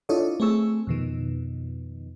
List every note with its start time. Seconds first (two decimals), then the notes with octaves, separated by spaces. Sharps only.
0.09 D4 E4 F4 A4 C#5 D#5
0.40 A3 C4 G#4 C#6 E6
0.87 F2 B2 D#3